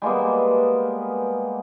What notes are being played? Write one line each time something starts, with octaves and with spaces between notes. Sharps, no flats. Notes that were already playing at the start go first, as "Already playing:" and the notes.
G3 G#3 A#3 B3